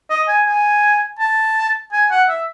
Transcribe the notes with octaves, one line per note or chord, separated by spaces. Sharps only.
D#5
G#5
G#5
A5
G#5
F#5
E5